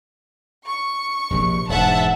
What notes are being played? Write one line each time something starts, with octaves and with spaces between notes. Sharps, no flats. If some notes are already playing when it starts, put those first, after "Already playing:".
C#6
A#1 C3
E1 G#2 E5 F#5 A5